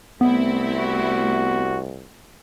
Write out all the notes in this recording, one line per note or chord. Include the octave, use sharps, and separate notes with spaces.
C2 A3 B3 C4 E4
F#4